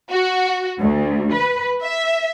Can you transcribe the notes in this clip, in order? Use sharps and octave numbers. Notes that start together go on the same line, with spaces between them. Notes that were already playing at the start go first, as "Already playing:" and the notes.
F#4
D2
B4
E5